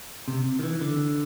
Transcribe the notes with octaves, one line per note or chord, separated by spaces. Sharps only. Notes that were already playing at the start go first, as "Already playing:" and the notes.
C3
D#3
E3
D3